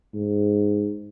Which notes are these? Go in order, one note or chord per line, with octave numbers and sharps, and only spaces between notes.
G#2